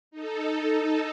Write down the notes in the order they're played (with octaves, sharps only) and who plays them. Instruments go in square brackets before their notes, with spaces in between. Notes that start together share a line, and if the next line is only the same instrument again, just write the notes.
[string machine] D#4 A4